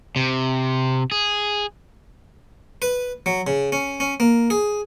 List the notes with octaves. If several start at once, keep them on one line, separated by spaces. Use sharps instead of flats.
C3
G#4
B4
F#3
C#3
C#4
C#4
A#3
G#4